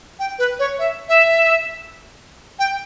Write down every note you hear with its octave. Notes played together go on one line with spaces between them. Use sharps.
G5
B4
C#5
E5
E5
G5